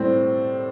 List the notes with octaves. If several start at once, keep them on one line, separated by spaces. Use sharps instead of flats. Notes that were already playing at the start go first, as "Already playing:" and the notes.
Already playing: A2 G3 C4